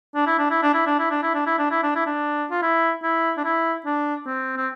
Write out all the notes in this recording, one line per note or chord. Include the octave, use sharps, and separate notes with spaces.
D4
E4
D4
E4
D4
E4
D4
E4
D4
E4
D4
E4
D4
E4
D4
E4
D4
F4
E4
E4
D4
E4
D4
C4
C4